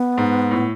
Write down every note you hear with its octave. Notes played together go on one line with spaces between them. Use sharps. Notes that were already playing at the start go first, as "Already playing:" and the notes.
Already playing: B3
G#2
A2